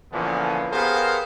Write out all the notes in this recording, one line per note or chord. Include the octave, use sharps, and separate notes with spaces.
A#2 D3 E3 F3 B3 C#4
B3 G4 G#4 A#4 C5 F5